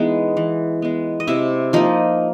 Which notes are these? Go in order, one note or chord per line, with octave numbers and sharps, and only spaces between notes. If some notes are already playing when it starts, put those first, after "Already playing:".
Already playing: E3 G#3 B3 D#4
E3
G#3 B3
D#5
C3 E4 E5
F3 A#3 D#4 D#5